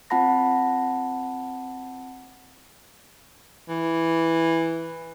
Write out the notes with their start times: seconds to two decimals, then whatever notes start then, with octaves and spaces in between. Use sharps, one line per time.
0.10 C4 F4 F#5 A5 B5 A#6
3.69 E3